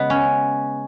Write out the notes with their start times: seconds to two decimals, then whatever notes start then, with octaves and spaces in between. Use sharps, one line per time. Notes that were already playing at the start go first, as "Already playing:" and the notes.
Already playing: C#3 G#3 B3
0.10 C#4